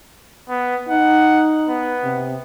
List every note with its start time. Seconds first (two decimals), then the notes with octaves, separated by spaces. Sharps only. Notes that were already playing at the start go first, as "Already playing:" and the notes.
0.49 B3
0.88 D#4 F#5
1.69 B3
2.04 C3